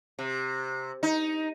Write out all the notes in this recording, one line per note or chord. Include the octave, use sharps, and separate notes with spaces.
C3
D#4